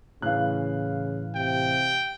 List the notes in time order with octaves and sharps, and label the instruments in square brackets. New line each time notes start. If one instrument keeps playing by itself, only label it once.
[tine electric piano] A2 E3 [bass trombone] C#3 [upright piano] F5 F#6
[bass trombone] C3 [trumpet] G5